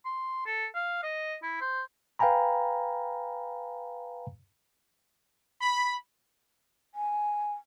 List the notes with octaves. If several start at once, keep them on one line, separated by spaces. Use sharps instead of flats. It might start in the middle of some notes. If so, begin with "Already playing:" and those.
C6
A4
F5
D#5
E4
C5
B4 F5 G5 G#5 A#5 B5
B5
G#5